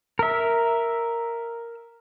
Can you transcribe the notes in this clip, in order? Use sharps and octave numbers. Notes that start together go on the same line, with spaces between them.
A#4 E5